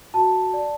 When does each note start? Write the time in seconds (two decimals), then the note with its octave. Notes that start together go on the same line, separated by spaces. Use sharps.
0.14 F#4 A5
0.54 D5